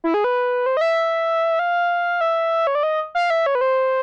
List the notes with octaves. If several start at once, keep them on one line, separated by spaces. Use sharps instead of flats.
E4
G#4
B4
C5
D#5
E5
F5
E5
C#5
D5
D#5
F5
E5
C#5
B4
C5